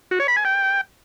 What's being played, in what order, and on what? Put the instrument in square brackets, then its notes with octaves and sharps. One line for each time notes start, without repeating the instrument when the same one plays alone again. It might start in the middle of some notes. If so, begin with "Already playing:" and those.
[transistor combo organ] F#4
C#5
B5
G#5
G5